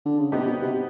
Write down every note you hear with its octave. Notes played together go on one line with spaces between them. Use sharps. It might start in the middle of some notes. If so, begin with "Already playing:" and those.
D3
C#3
C3 G3 B3 D#4 G4
B2
C3